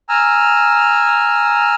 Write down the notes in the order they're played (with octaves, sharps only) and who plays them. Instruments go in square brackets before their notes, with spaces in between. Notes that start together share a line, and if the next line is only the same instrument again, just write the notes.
[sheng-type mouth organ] G#5 A#5 E6 F6